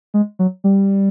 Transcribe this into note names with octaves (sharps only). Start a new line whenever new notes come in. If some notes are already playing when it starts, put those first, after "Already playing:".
G#3
F#3
G3